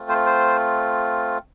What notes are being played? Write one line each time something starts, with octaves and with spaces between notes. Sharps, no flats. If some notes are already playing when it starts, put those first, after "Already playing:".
Already playing: A3 C4 F4
C5
C5